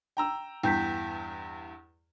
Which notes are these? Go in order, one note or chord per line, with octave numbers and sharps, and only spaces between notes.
G5 A#5 E6
E2 G2 G5 G6 B6